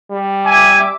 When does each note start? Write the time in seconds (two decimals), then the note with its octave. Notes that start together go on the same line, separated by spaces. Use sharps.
0.11 G3
0.46 E5 G#5 D6